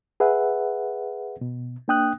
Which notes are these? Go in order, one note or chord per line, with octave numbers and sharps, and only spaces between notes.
G#4 B4 E5 F#5
B2
A#3 D4 G5 D#6 F#6